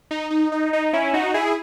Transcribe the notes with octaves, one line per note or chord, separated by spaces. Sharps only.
D#4
D#4
D#4
D#4
C#4 E4
D#4 F#4
E4 G#4